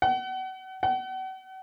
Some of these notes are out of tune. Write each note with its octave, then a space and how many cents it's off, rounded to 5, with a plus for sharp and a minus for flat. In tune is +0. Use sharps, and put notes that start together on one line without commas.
F#5 +35
F#5 +40